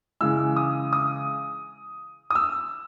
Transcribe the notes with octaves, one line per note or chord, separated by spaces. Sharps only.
C#3 E3 G#3 E6
D#6
D#6
D#6
E6